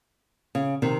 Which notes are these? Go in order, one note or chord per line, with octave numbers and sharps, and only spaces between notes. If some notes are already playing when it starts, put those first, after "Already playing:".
C#3
C3 D#3